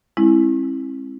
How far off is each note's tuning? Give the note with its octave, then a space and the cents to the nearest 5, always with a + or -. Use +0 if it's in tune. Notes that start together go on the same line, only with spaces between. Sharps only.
G#3 +0 C4 +40 E4 +0